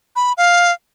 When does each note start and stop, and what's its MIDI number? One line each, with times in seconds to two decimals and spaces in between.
0.16 0.33 83
0.37 0.72 77